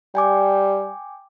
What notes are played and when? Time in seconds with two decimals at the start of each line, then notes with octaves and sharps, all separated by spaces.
0.15 G3 G5 G#5 D6